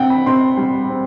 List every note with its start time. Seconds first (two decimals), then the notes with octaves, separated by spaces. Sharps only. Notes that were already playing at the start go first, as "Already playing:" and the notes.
Already playing: C3 C4 F#5 G5
0.10 B5
0.26 C3 C6
0.57 G3
0.90 C4